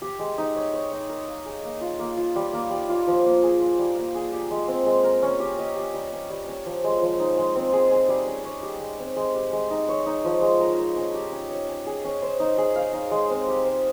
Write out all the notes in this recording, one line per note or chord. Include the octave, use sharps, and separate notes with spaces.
G4
G#3
D#4
C#5
C#5
D#4
A#4
F5
G#4
A#3
F4
A#3
F4
G3
A#3
G3
F4
F3
A#3
G#4
F4
G3
A#3
G#4
G4
G#3
C4
G#3
A#4
C#4
G4
D#5
G4
G3
C#4
G3
C#4
F3
G#3
F3
D#4
G#3
C4
G#4
G#4
G3
C#4
C#5
G4
G#3
C4
G#3
G4
G#3
D#4
C#5
D#4
F3
G#3
A#4
A#4
C#4
G4
C#4
C#5
C#4
G#4
C#4
C5
D#4
G#4
F5
D#4
G#3
C4
G4
C5